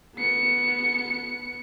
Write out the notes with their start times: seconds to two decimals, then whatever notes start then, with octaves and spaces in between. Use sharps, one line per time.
0.15 B3 C#7